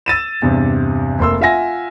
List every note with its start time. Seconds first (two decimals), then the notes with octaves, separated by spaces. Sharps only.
0.06 E6 A6 D#7 E7
0.42 E2 G2 C3
1.19 F1 A#3 C6 E6
1.41 F4 E5 F#5 G#5 A#6